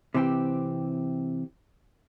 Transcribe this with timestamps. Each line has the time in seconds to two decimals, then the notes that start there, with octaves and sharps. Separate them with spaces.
0.14 C3 E3 C4 G4